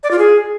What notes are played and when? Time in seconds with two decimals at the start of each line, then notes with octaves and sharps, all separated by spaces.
0.03 D5
0.11 F4
0.19 G#4